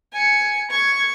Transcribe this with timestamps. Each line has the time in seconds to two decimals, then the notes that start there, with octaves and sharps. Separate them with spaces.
0.13 G#5 C#7
0.71 C#6 G#6